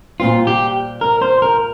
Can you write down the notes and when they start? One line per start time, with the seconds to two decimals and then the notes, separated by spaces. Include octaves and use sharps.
0.20 A#2 G3 C4 F4
0.47 G4
1.01 A#4
1.22 C5
1.42 A#4